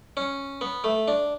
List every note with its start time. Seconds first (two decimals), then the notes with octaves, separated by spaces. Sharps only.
0.17 C#4
0.61 B3
0.84 A3
1.08 D4